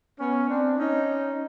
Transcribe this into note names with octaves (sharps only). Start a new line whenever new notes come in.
B3 C#4
C4 D4
C#4 D#4